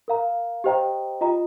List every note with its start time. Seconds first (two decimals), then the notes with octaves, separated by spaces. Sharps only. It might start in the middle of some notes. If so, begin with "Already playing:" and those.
0.08 A#4 F5 A#5
0.64 G4 C5 D#5 G5 A#5
1.21 F4 D#5 A#5